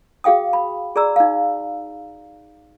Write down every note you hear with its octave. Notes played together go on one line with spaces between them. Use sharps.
F#4 G#4 F5 G5 D#6
B5
G#4 D5 A#5 E6
D#4 F5